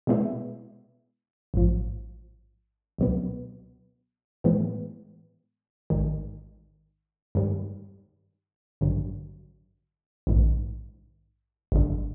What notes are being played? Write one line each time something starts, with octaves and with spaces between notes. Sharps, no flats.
B2 G#3 B3 E4
A1 G#2 F3
C#2 B2 F#3 B3
A2 E3 G#3 B3
A1 G#2 D#3
G2 D#3 G3
A1 G2 D3 F#3
A#1 G#2 D#3
G#1 F#2 D3